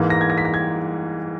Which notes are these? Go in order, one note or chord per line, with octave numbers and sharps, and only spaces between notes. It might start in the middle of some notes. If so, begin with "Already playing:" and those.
Already playing: G#2 E3 A#3
A#6
G#6
A#6
B6
A#6
G#6